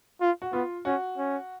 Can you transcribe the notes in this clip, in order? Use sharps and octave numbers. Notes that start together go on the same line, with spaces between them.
F4
F#4
B3 F4
C#4 F#4
C#4